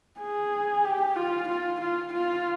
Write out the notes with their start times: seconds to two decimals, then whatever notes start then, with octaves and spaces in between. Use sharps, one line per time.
0.20 G#4
0.85 G4
1.16 F4
1.48 F4
1.81 F4
2.13 F4